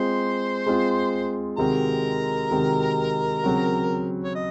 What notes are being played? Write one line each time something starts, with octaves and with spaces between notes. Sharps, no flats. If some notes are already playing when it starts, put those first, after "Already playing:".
Already playing: G#3 C4 F4 C5 C6
G#3 C4 F4
C3 D#3 G#3 C4 F#4 A#4 A#5
C3 D#3 G#3 C4 F#4
C#3 F#3 C4 F#4
C#5
D#5